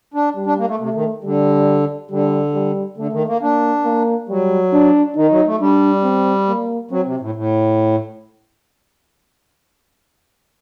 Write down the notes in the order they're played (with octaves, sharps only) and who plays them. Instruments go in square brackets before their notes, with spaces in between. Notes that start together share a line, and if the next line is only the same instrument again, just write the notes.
[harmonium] D4
[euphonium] G3
[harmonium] D4
A#3
A3
[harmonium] C3 [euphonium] A3
[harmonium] D#3
[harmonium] D3 [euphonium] G3
[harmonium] D3 [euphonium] G3
[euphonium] G3
[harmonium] D3 [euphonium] A3
[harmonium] D#3
A#3
[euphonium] A#3 [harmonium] D4
[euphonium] A#3
[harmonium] F#3 [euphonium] G3
[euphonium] D4
[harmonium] D#3 [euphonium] D#4
[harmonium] F#3
A3
[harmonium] G3 [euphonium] D4
[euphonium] C4
A#3
[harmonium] F#3 [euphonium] C4
[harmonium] C3
A2
A2